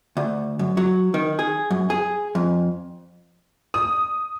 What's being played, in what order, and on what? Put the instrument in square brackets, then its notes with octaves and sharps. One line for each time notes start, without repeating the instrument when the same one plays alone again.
[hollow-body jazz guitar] D2
F#2
F#3
D#3
G#4
F#2
G#4
F2
[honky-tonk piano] D#6